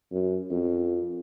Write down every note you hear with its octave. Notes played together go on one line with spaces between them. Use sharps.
F#2
F2